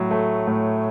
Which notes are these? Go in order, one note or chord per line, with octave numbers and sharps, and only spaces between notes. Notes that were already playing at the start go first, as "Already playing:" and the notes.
Already playing: A2 F#3
A3
A2